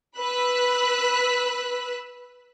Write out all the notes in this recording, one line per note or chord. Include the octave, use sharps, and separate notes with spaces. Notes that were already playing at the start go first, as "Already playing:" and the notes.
B4 E6 F#6 B6